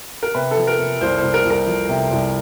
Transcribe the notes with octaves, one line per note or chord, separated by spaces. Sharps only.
A#4
C3 B4
A4
F3
A#4
C3
C2 C5
C2 C5
A#4
C2
A#4
F3
C3
C2